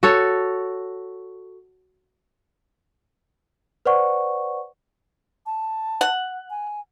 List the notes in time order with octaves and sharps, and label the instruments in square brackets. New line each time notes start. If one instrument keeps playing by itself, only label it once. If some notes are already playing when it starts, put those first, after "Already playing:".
[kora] F#4 A4 C#5
[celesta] B4 C5 D5 F#5 C#6
[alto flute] A5
[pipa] F#5
[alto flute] G#5